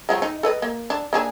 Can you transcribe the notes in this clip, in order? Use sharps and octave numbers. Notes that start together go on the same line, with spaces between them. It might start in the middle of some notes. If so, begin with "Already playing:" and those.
F3 F#3 G#3
D#4
A4 B4 D#5
A#3
D4
A#3 D4 G#4